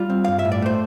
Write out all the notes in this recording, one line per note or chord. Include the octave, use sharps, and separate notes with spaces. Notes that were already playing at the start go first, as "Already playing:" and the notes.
Already playing: G3 F4
C4
G2 F5
E5
A2
D5
A3 C5